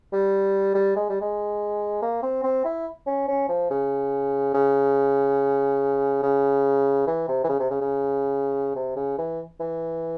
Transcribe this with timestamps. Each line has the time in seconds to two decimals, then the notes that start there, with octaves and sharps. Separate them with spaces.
0.13 G3
0.75 G3
0.96 G#3
1.09 G3
1.21 G#3
2.02 A#3
2.23 C4
2.43 C4
2.65 E4
3.07 C#4
3.28 C#4
3.49 F3
3.71 C#3
4.54 C#3
6.23 C#3
7.07 E3
7.29 C3
7.44 E3
7.49 C#3
7.59 C3
7.71 C#3
7.81 C#3
8.76 C3
8.96 C#3
9.18 E3
9.60 E3